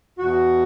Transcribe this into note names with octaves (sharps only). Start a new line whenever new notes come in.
E2 B2 F#4